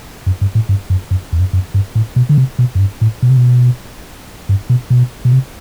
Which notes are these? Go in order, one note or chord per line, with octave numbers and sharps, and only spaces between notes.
F#2
G2
A2
G2
F#2
F#2
E2
F#2
F#2
G2
A2
B2
D3
C3
B2
F#2
G2
A2
B2
C3
B2
G2
B2
B2
B2
C3